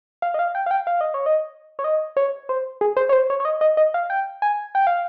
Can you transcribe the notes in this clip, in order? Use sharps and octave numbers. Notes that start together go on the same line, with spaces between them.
F5
D#5
F5
G5
F5
G5
F5
D#5
C#5
D#5
C#5
D#5
C#5
C5
G#4
C5
C#5
C5
C#5
C#5
D#5
D#5
D#5
F5
G5
G#5
G5
F5